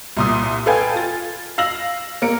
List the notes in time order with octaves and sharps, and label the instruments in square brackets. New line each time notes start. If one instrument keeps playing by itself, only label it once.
[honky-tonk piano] C2 A#2 D#6
A4 B4 F5 G5 G#5 G#6
F4 A6
F5 E6 A#6 F#7
A#3 A#4 C#7 D7